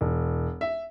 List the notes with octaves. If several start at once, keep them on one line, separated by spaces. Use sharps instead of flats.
E1
E5